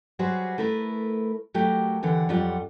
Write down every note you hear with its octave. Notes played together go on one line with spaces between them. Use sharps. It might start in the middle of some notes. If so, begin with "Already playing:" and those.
F#3 G3 F#4 G#4 B4 C5
A3 E4 A#4 B4
F#3 A3 G4 A#4
D#2 D3 E3 F#5
F2 F#3 G3 F4 F#5